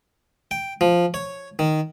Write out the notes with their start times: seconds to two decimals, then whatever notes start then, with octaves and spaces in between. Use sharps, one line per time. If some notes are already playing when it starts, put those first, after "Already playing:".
0.51 G5
0.81 F3
1.14 C#5
1.59 D#3